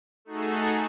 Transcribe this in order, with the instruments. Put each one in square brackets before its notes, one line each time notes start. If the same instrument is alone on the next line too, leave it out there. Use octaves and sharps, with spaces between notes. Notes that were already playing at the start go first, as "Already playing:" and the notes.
[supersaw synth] A3 D#4 F#4 G#4 A4